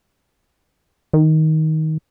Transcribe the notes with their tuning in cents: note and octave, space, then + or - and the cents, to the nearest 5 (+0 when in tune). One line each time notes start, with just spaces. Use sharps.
D#3 +15